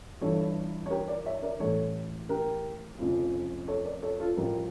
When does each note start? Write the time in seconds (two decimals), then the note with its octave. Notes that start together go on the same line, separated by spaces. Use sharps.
0.21 G1 G2 E3 A4 C#5
0.86 C#5
0.90 G4 A#4
1.08 A#4 D5
1.26 C#5 E5
1.42 A#4 D5
1.60 A1 A2 E3 A4 C#5
2.29 G4 A#4
2.98 F1 F2 C#3
3.68 A4 C#5
3.85 A#4 D5
4.02 A4 C#5
4.20 F4 A4
4.37 A1 A2 F3 G4 A#4